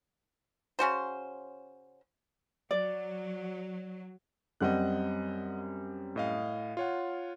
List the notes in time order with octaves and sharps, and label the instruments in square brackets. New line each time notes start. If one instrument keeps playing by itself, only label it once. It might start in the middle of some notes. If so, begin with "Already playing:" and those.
[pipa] C#3 C#4 F#4 C5
[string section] F#3 [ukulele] D5
[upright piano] F#2 G3 C4 [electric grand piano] D#5 F#5 F#6
[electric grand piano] A2 D#5 F5
F4 C#5 F#5